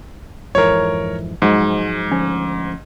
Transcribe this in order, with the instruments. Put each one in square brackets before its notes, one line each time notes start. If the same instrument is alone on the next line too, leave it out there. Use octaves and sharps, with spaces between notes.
[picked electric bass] F2 G#2 E3 [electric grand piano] A#4 C#5
[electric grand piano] G#2 [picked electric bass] F3 F#3 G#3
[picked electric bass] D2 F3 C#4